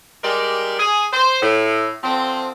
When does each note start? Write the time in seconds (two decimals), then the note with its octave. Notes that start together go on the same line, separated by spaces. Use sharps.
0.24 G3 G#3 G4 A#4 D5
0.79 G#4
1.12 C5
1.42 A2
2.03 D3 F3 C4